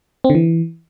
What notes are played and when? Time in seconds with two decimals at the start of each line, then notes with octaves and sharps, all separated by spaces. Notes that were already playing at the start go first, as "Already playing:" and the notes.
0.24 C4
0.30 D3
0.35 E3